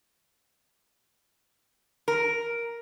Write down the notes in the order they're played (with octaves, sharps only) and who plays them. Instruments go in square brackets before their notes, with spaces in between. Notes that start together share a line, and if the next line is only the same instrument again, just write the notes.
[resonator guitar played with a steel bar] A#4